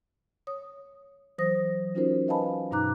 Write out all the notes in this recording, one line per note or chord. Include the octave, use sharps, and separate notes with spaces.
C#5 D#6
E3 F#3 C5 D#6 A#6
C#4 D#4 F4 F#4 A#4 C5
B4 D#5 F5 G#5 A5 B5
G2 B2 D#4 A#5 D6 F#6